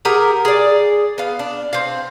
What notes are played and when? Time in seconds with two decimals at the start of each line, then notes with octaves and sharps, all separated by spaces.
0.05 G4 G#4 A#4 F#5
0.45 G#4 D5
1.18 B3 F5
1.39 D4
1.73 C4 F5